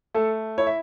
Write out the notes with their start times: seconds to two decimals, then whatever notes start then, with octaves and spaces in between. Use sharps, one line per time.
0.15 A3 A4
0.58 E4 C#5
0.67 E5